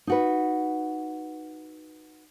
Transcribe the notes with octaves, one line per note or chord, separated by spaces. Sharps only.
D#4 F#4 B4